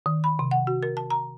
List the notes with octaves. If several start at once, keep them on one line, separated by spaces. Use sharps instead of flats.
D#3
B5
C3
F#5
F#4
A#4
A5
A#5